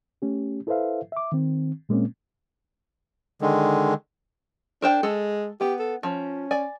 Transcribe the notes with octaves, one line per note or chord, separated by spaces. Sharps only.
A3 C#4 G4
E4 A4 B4 C5 E5 F5
E5 D6
D#3 C4
A#2 G#3 A#3 C4 C#4
D3 D#3 G#3
D4 A#4 C5 G5
G#3 A4
B3 G4
A4
F3 C#4
D5 G#5